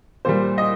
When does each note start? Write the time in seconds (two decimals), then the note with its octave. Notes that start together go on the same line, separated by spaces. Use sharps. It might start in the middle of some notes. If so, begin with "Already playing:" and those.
0.25 A#2 G3 C5
0.58 D#5